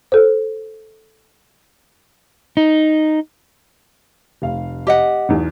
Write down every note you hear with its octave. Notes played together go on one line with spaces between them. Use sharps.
A4 C5
D#4
F1 F5
G4 D#5 F#5
B1 E2 B2